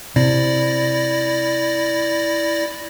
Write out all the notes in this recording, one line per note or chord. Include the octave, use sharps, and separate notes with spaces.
C3 E4 D5 A#6